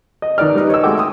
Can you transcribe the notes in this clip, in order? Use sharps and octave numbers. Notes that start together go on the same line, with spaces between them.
D#5
D#3 D#4 B4 D5 F6
G3 D#4 B4
C#5 D#5 E6
G#3 A3 F#4 G5 D6
D#6